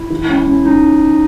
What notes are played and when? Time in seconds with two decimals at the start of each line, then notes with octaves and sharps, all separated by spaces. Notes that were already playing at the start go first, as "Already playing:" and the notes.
Already playing: E4
0.10 E3
0.28 C#4
0.46 C#4
0.65 C#4 D#4